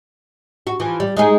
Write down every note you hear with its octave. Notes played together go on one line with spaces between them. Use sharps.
F#4
E3 F3
G3
G#3 D#4 G#4